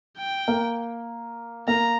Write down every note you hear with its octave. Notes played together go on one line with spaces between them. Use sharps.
G5
A#3
A#3 A#5